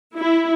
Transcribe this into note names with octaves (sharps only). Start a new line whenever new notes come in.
E4